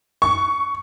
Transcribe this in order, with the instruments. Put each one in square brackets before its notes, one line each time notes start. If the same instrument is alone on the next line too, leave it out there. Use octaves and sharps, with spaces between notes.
[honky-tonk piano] C#6